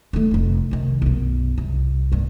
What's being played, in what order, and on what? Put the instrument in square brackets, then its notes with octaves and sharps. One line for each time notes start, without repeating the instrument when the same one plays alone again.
[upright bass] D3 A3
F1 D3
C3 D#3
B1 F#2
C2
F#1 G2